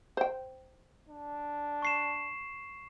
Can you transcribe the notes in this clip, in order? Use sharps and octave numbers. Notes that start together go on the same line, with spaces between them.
C5 G5
D4
C#6 C7 E7